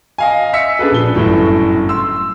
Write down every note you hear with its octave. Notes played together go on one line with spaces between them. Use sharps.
D#5 F5 G#5
E5 E6 B6 C#7
D4 G#4 A4 B4
A#1 G7
G1 F#2 A2 F#3 A4
C6 E6